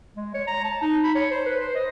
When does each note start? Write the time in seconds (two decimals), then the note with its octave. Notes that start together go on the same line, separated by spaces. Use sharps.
0.17 G#3
0.34 C#5
0.47 A#5
0.64 A5
0.82 D#4
1.04 B5
1.15 C#5
1.31 C5
1.46 B4
1.60 C5
1.75 D#5